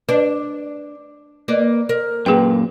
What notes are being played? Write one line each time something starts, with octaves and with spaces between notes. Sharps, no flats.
D4 B4
A#3 B4 D5
A#4
F#2 A#2 G#4 B4 G5